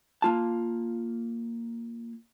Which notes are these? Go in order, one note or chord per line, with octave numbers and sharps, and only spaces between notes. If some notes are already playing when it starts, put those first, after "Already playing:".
A#3 F4 A5